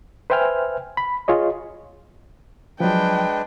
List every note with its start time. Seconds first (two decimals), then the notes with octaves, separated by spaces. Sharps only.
0.30 B4 C5 E5 G5 G#5 F6
0.97 B5
1.28 F4 G#4 C#5 D#5
2.80 F3 F#3 G#3 D4 B4 G5